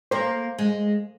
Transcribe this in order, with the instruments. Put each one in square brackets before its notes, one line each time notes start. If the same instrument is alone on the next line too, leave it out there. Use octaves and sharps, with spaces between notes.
[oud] A#3 [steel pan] C5
[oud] G#3